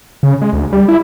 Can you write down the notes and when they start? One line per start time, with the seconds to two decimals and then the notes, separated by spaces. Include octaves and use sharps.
0.23 C#3
0.42 G#3
0.53 D2
0.73 G3
0.88 E4